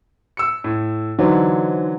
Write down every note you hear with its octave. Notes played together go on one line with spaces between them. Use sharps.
E6 C#7
A2
D3 E3 F#3 D#4 C5